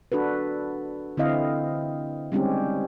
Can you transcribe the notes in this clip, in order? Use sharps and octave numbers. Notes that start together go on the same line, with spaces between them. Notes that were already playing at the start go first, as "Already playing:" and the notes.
D4 F#4 A4 B4
D3 C4 E4 D#5 F5
G3 G#3 C4 C#4 D#4 G4